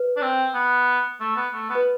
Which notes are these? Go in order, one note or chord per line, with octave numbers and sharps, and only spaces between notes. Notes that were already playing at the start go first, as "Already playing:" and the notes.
Already playing: B4
D4
C4
B3
A3
B3
A3
B3
B4